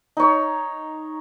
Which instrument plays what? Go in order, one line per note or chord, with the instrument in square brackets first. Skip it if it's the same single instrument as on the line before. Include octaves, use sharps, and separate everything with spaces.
[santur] D#4 C#5